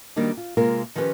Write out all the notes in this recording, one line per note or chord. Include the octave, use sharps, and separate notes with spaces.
D#3 F#3 G3 A#3 D4 D#4
F4
C3 G#3 A#3 F4 A#4
D#3 F3 C#4 G4 B4